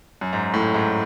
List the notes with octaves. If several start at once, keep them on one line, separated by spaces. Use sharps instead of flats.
F#2
G#2
A2
G#2